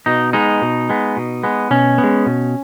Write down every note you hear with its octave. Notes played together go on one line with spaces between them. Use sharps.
B2 D#4
G#3 B3 D#4
B2
G#3 B3
B2
G#3 B3
B2 C#4
B3
G#3
B2